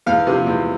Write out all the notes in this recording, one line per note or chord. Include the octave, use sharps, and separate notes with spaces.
E2 F5
C3 F3
E2